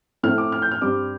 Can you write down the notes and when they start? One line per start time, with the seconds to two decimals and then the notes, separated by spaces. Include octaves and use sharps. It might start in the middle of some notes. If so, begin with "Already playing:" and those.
0.23 A2 A3 C4 F6
0.38 D6
0.52 F6
0.62 G6
0.71 F6
0.81 G2 G3 C4 D6